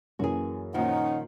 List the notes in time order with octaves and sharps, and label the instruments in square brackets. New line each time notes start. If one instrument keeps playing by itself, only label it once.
[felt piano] F#2 E3 A#3 [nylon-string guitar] F#4 G#4
[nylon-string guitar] A#2 D#3 F3 [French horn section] C#4 D#4 [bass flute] F#5